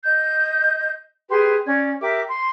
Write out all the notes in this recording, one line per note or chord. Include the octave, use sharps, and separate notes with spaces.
D#5 G6
G4 G#4 B4 C6
C#4 D5 G#6
G4 A#4 E5 D6
C6